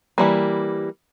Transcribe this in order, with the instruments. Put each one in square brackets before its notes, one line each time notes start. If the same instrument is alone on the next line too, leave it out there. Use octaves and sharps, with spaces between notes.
[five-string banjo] E3 G3 A#3